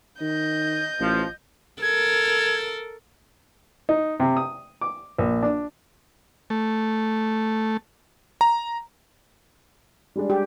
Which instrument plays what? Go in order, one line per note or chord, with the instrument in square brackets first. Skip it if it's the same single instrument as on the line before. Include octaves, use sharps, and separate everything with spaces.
[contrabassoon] D#3 [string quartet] D#5 G6
[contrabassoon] A1 [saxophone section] F3
[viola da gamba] A4 A#4 [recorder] G#6
[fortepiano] D#4
C3
D#6
D6
A#1
D4
[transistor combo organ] A3
[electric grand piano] A#5
[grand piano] G3 G#3 D4
[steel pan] G4